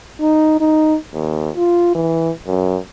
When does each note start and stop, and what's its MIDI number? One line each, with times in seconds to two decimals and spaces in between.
0.21 0.56 63
0.60 0.97 63
1.14 1.50 39
1.55 1.92 65
1.95 2.31 52
2.47 2.78 42